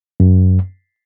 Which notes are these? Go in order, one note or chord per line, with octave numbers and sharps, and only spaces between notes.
F#2